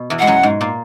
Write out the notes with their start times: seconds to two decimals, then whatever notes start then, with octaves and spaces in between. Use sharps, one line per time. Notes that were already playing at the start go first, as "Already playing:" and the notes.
Already playing: B2
0.10 E2 E3
0.19 G#3 F#5
0.27 F#2 F#3
0.43 G#2 G#3
0.61 A#2 A#3